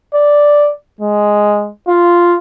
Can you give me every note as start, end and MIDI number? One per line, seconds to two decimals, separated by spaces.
0.15 0.71 74
1.01 1.70 56
1.88 2.37 65